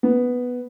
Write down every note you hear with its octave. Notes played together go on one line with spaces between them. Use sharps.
B3